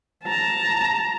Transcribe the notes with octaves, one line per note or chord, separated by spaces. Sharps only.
A5 A#5